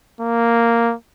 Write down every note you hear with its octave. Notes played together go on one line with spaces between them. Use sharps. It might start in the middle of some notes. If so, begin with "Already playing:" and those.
A#3